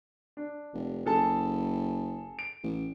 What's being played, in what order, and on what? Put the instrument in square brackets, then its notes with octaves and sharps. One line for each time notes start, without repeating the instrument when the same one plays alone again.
[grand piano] D4
[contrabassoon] F1
[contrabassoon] F#1 [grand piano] G#4 A4 A5
[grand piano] D7
[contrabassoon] A1